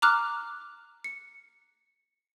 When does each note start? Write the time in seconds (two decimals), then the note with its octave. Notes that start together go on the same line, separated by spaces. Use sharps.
0.02 A#5 D6 F6 F#6
1.04 C#7